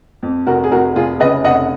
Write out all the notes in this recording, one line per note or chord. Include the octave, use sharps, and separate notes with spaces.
F2
F1 F#4 A#4
G#4
F1 F#4 A#4
F1 F4 G#4
C#3 B4 D#5
F1 D#5 F#5